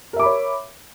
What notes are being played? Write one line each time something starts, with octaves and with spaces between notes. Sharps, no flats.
A#4 C#5 E5 B5 D6